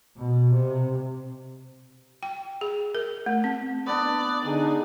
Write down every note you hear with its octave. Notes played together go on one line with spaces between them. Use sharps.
B2
C3
G5
G#4
A#4
A3
C4
B3 D4 D5
D3 D#4 G#4